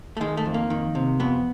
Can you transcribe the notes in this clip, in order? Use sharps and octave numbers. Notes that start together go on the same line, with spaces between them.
A3
D#3 G#3
A3
F2
A#3
D#3
C3
F2 B3